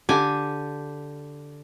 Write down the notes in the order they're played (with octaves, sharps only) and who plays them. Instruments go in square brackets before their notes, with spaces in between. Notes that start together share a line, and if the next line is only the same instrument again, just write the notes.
[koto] D3 G4 G#5